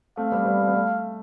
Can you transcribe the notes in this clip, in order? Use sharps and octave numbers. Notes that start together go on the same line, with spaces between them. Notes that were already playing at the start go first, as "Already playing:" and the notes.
A3 C4 F5
G3 B3
G3 B3
A3
B3
A3